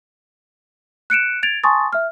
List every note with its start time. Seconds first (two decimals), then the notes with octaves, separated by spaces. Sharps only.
1.10 F#6 C#7 D7 E7
1.43 G#6 A6 D7 F7
1.63 G#5 A5 C6 C#6 D#6 A6
1.93 E5 F6